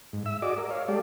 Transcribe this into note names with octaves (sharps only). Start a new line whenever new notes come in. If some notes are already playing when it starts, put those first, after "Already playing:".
G#2
E5 E6
F#4 G#4 D5 D#5 D6
A#4
C#5 F5
G#3 G4 A4 D5